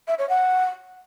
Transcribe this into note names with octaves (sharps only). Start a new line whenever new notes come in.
E5
C#5
F#5